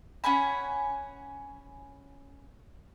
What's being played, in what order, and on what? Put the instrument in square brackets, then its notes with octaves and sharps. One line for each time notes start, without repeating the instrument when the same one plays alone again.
[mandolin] C#4 F#5 G#5 B5